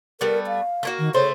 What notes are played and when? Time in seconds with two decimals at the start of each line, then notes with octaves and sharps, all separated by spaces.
0.21 G3 A3 B3 A#4
0.47 F5
0.83 A3 A#3 F#4
0.99 D#3
1.14 C#3 A3 C5 C#5